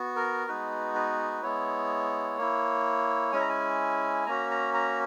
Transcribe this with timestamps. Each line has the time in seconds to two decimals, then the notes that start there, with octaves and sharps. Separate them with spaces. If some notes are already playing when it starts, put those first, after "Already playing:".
Already playing: B3 F#4
0.16 A#4
0.48 G#3 B3 D#4 F#4 B4
0.95 B4
1.42 G#3 B3 E4 C#5
2.37 A#3 E4
3.32 G#3 C#4 E4 G#5
3.40 A#5
3.49 G#5
4.27 A#3 C#4 F#4 A#5
4.51 A#5
4.74 A#5